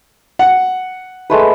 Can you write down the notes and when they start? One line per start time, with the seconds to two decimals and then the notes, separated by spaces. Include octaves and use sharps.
0.39 F#5
1.30 G#3 A3 B4